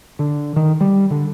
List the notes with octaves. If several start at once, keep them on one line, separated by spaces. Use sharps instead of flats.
D3
D#3
G3
D3